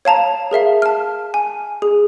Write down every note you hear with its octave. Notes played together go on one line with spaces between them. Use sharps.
C#5 F5 A5 A#5
G#4 A#4 E5 F5
A5 F6
G#5
G#4